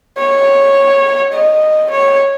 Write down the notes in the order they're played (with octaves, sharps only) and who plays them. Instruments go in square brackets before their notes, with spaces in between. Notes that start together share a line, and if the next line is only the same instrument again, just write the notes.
[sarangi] C#5
D#5
C#5